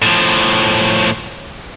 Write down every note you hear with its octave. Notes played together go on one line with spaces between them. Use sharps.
A2 F3